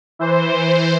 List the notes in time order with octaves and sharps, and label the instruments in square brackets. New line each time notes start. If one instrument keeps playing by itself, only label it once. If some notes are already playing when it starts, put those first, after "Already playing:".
[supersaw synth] E3 C5